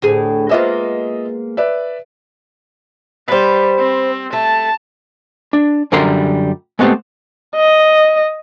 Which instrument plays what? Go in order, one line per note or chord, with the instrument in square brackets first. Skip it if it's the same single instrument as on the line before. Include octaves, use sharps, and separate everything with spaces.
[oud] D2 A2 G#4
[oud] G#3 A#3 B3 [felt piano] F4 D#5 E5
[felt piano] B4 D5 E5
[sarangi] G3 [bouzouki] B4 C5
[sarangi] C4
[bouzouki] A3 [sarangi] A5
[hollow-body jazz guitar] D4
F#2 D3 G3 A#4 F#5 C6
G#3 A3 B3 C4 G4
[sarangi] D#5